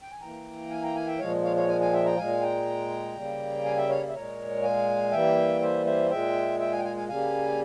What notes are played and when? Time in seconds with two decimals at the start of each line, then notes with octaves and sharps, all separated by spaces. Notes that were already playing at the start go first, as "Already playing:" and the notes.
0.02 G5
0.12 G#5
0.21 E3 A#3 G5 A#5
0.70 F5 G#5
0.83 G5 A#5
0.95 F5 G#5
1.07 E5 G5
1.19 A#2 F3 G#3 C#5 F5
1.44 C#5 F5
1.56 C#5 F5
1.69 F5 G#5
1.81 F5 G#5
1.93 E5 G5
2.06 G5 A#5
2.17 A#2 G#3 F5 G#5
2.42 G5 A#5
3.16 C#3 G3 A#3
3.65 F5 G#5
3.77 E5 G5
3.89 C#5 F5
4.09 E5
4.14 A#2 G#3 A#4 C#5
4.63 F5 G#5
5.12 E3 G3 A#3 E5 G5
5.61 C5 E5
5.86 C5 E5
6.10 A#2 G#3 E5 G5
6.59 E5 G5
6.72 F5 G#5
6.78 G5
6.84 F5 G#5
6.97 F5 G#5
7.09 C#3 G3 A#3 F5 G#5